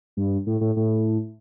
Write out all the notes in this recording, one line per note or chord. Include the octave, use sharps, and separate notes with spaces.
G2
A2
A2
A2